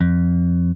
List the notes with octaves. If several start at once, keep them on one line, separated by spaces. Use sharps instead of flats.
F2